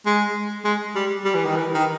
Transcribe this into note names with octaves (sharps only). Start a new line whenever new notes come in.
G#3
G#3
G3
G3
E3
D#3
E3
D#3